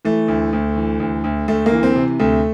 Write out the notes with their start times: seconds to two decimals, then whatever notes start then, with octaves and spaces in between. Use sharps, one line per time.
0.05 E3 A3
0.28 D2
0.53 D2
0.76 E3
1.00 D2
1.24 D2
1.48 D2 A3
1.66 A#3
1.71 E3
1.83 C4
1.96 C3
2.20 D2 A3